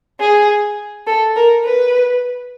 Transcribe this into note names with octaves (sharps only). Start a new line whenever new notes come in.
G#4
A4
A#4
B4